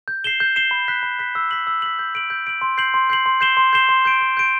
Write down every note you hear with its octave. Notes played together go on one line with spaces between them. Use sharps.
G6
C7 E7 G7
G6
C7 E7 G7
B5
F#6 B6
B5
F#6 B6
E6
B6 F#7
E6
B6 F#7
G6
D7 F#7
G6
D7 F#7
C6
G6 C7 F#7
C6
G6 C7 F#7
C6
G6 C7 E7 G7
C6
G6 C7 E7 G7
C6
G6 D7
C6
G6 D7